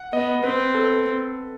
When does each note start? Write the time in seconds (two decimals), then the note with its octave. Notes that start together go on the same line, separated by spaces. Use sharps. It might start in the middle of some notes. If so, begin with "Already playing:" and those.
Already playing: F#5
0.13 B3 D#5
0.43 C4 B4
0.74 A4
0.84 B4